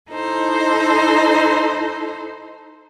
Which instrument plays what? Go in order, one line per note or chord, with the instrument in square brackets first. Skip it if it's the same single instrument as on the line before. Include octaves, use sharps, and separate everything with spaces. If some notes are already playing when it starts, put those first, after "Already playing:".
[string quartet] D#4 E4 A4 C5